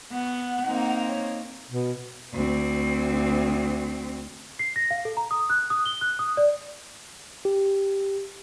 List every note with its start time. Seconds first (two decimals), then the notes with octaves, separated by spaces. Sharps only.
0.12 B3 F#5
0.66 A#3 C4 D#4
1.08 C#5
1.69 B2
2.33 D2 C4
4.59 C7
4.76 A#6
4.91 F5
5.05 A4
5.17 A#5
5.31 D#6
5.50 F#6
5.70 D#6
5.86 G7
6.01 F#6
6.19 D#6
6.37 D5
7.45 G4